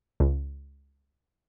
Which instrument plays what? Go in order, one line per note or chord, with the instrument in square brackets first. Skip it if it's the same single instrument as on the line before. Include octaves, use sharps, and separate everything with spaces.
[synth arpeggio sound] C#2